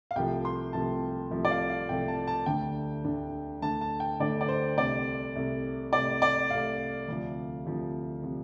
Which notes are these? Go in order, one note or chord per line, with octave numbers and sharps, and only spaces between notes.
F5
C2 C3 F3 A3 G5
C6
C2 C3 F3 A3 A5
C2 C3 F3 A3
D5
F5
F5
C2 C3 F3 A3 G5
A5
A5
D2 D3 A3 D4 G5
D2 D3 A3 D4
D2 D3 A3 D4 A5
A5
G5
D2 D3 A3 D4 D5
D5
C5
C2 C3 A3 D5
C2 C3 A3
C2 C3 A3 D5
D5
C2 C3 A3 F5
D2 C3 F3
D2 C3 F3
C3 F3